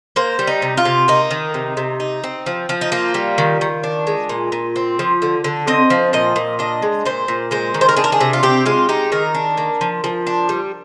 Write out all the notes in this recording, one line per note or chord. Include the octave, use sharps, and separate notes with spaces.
A#3 C5
G3
D#4
C3
F4
C3
A#3 D#4
D#3
C3
C3
D#4
C4
F3
F3
D#4
A#3 F4
G3
D#3
D#3
D4
G#3
A#2
A#2
C4
F3
D3
D3
C4 D#5
F3
A#2 D#5
A#2
D4 D#5
G#3
A#2 C5
A#2
G#3 C5
D#3
C5
A#4
D4 G#4
A#4
G#4
C3
F4
C4 G4
G#3 F4
D#4 G4
D#3 A#4
D4
A#3
F3
F3
D4
G3